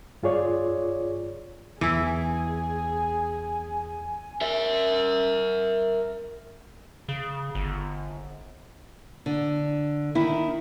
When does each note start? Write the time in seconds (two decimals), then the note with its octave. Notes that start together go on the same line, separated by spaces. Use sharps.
0.23 G2 F4 G#4 C#5 D5
1.81 E2 E3 E4 G#4 G#5
4.41 A#4 E5
7.09 C#3
7.55 G1
9.26 D3
10.15 D#3 E4